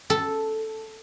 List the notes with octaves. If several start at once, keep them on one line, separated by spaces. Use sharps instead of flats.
A4